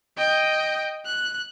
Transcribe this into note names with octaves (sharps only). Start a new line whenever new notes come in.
D#5 G5
F#6